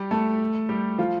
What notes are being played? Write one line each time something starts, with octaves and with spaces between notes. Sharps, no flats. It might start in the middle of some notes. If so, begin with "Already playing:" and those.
Already playing: G3 G4
A3 A4
G3 G4
F3 F4